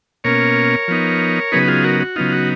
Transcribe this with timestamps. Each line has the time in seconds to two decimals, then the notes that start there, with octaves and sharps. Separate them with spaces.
0.24 B2 A#3 C#4 A#4 C#5
0.88 F3 B3 D#4
1.52 C#3 F#3 B3 D#4 G#4 B4
1.68 F4 G#4
1.84 F#4 A#4
2.00 F#4
2.16 C#3 F#3 B3 D#4 F4
2.33 F#4